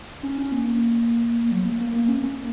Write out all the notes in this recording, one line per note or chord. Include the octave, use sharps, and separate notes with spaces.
C#4
C#4
A#3
F#3
A#3
A#3
A#3
C#4
A#3